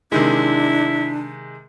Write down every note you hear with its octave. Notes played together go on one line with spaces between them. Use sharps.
C3 D#3 G#3 D4 E4